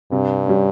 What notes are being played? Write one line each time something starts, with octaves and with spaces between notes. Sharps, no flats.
G2 C3
G3 C#4